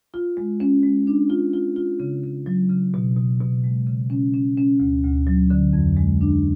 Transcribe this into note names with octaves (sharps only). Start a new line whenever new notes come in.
F4
G#3
C#4
G#3
D4
F4
F4
F4
C#3
C#3
F#3
C#3
B2
B2
B2
G#3
C#3
C#4
C#4
C#4
D2
D2
F#3
D3
F2
G#3
D4